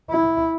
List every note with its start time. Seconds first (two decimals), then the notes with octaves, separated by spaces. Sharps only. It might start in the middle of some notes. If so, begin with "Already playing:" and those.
0.10 E4